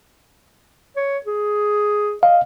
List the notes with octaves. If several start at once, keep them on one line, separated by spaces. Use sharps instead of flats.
C#5
G#4
D#5 F5